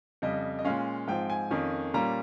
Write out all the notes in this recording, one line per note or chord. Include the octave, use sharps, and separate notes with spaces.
F2 C#3 G3 D#5
D#5
A#2 G#3 C#4 F5
G#2 F3 C4 G5
G#5
F2 D#3 A#3 C#4
A#2 G3 A#3 C#4 A#5